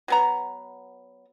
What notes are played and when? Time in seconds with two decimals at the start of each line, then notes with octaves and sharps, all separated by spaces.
0.08 F#3 B3 A#5